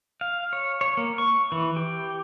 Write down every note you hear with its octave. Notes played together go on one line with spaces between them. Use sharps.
F5
C#5
C#5
A#3
C#6
E3
G4